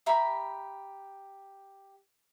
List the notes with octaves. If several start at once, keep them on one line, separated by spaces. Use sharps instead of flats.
G4 E5 A#5 B5